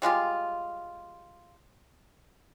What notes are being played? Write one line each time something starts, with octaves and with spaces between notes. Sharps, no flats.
G3 G#3 F4 G4